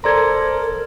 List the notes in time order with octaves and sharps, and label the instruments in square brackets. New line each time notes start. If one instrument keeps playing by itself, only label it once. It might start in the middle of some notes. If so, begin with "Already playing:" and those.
[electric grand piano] A4 D5 A#5 [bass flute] A#4 [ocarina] C5 [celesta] C6 G#6